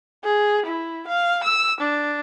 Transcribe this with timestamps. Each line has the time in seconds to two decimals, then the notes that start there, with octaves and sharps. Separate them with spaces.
0.24 G#4
0.66 E4
1.07 F5
1.44 E6
1.80 D4